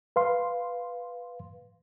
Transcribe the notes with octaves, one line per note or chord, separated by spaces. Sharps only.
B4 F5 C6